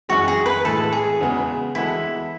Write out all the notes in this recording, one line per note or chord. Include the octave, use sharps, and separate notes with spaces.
F#2 E3 G#3 F#4
G#4
B4
A2 E3 G#3 A4
G#4
E2 C#3 G#3 B3 F#4
E3 G#3 B3 E4 F#4 A4